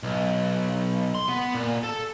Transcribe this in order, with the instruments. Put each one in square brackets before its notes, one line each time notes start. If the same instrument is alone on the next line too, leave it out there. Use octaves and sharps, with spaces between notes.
[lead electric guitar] B1
C6
B3
A#2
A4